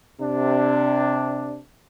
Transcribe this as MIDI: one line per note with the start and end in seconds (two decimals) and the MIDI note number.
0.20 1.59 48
0.20 1.59 62